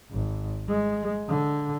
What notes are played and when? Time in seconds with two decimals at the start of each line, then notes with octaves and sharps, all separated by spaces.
0.11 G#1
0.69 G#3
1.28 D3